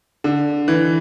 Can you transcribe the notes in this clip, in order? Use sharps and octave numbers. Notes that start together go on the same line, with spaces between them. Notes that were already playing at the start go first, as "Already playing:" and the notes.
D3
E3